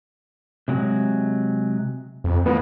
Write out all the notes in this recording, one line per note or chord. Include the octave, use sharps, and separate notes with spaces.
C3 F#3 G#3
F2
E2 A2 A#3 B3